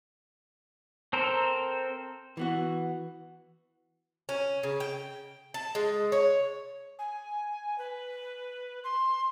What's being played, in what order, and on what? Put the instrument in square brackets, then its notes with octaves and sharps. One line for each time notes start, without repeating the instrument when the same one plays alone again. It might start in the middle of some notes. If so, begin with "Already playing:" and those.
[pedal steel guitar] C4 A4 A#4 C5
[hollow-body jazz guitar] E3 B3 F#4
[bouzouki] C#4
C#3
G5
A5
G#3
C#5
[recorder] G#5
B4
C6